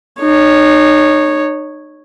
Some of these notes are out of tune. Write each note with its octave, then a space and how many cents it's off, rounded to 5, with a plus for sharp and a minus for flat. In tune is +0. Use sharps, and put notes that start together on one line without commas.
D#4 -30 C#5 -5